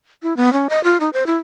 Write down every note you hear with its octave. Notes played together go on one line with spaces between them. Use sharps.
E4
B3
C#4
D#5
F4
D#4
C5
E4